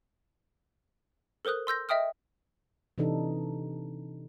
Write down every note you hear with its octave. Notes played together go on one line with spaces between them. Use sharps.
A4 A#4 C5 D#6 F#6
C6 E6 G6 A#6
D#5 E5 G5 D#6 F6
C3 E3 D4 D#4 A4